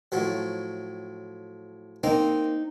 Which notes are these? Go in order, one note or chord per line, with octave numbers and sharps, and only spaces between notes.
A2 F3 F#3
A#3 C4 D#4